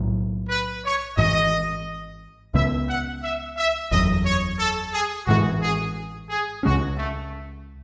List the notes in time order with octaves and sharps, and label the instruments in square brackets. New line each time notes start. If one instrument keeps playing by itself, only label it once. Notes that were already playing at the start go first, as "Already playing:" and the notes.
Already playing: [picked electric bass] B1 A2 F#3
[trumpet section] B4
C#5
[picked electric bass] G#1 G#2 E3 [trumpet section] D#5
[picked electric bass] C#2 C#3 G#3 B3 [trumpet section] E5
[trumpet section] F#5
E5
E5
[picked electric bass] F#1 E2 C#3 F#3 [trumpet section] D#5
[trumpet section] C#5
A4
G#4
[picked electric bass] A1 G#2 E3 G#3 [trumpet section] F#4
[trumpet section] G#4
G#4
[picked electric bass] C#2 C#3 G#3 C#4 [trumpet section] F#4
[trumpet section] A3